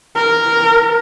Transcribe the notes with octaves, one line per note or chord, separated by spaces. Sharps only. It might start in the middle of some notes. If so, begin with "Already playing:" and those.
A#4